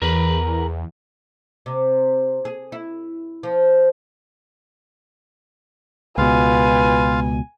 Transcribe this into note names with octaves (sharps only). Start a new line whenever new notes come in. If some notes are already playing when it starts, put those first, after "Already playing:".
E2 A#4 B4 B5
C3
G#4
E4
F3
C#2 B2 F4 B4 F5 G#5